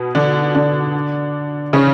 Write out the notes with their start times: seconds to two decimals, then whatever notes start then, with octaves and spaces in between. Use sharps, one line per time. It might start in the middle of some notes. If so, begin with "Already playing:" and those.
Already playing: B2 B3
0.15 D3 D4
0.55 D3 D4
1.73 C#3 C#4